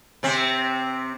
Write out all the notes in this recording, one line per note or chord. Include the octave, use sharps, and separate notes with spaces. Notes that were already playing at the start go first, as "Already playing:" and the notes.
C3 C4